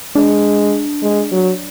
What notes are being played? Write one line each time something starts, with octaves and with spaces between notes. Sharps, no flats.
G#3 D4
G#3
F#3